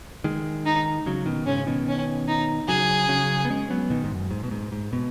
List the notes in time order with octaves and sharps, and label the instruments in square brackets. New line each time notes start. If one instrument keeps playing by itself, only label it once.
[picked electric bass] D#3 G#3
[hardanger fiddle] D#4
[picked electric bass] C#3 F#3
B2 D#3
[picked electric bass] G#2 C#3 [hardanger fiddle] C#4
[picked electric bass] B2 D#3
[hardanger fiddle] C#4
D#4
[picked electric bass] C#3 F#3 [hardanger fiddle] G#4
[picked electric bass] C#3 F#3
B3
G#3 C#4
F#3 B3
B2 D#3
G#2
F#2
G#2
B2
G#2
G#2
B2